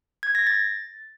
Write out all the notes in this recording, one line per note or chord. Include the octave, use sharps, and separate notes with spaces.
G#6
A#6
A6